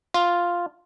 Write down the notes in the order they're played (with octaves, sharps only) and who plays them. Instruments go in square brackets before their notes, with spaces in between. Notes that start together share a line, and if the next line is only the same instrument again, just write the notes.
[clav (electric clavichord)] F4